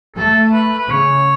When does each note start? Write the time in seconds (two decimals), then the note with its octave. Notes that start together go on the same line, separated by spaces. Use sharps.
0.16 A3 A4
0.53 B4
0.78 B4
0.90 C#3 C#5